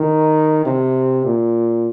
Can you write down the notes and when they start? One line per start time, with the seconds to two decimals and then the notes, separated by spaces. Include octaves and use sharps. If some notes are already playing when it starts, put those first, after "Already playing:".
Already playing: D#3
0.66 C3
1.25 A#2